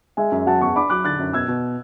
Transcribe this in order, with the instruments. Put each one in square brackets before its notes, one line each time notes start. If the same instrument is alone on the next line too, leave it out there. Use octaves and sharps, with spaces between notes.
[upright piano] G#3 [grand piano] E5 G#5
[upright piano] F#2
[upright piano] F#3 [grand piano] F#5 A5
[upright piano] E2 [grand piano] A5 C#6
[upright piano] D4 [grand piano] B5 D6
[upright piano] F#3 [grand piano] D6 F#6
[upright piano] D3 [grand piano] F#6 A6
[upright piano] F#2
[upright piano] B2 [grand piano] E6 G#6
[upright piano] B2